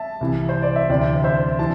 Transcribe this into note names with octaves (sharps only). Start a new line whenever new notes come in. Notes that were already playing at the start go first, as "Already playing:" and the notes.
Already playing: E5 A5
C2 C3 E3
C5
D5
E5
D2 C3 E3 D5 G5
C5 E5
E3 A5